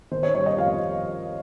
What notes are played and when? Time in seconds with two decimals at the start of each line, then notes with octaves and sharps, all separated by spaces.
0.11 D#3 C5
0.23 C#5
0.35 G3 C#5
0.46 D#5
0.58 F2 F5